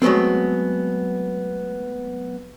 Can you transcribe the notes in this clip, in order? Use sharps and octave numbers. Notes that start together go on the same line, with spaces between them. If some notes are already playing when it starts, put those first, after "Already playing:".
F#3 G#3 A3 B3 C4